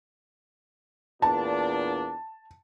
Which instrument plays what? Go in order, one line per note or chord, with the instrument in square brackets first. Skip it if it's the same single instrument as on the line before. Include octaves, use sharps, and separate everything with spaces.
[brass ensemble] E2 A#2 D4 [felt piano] A5